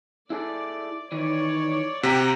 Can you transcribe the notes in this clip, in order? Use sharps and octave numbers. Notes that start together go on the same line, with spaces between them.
E4 G#4 A4 D5
D#3 E3 C#5 D5
C3 F#4 G4 F#5 G5 A#5 B6